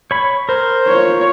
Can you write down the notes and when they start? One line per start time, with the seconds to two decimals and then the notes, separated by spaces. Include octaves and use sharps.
0.11 C#5 B5
0.49 A#4 C5
0.87 F4 C#5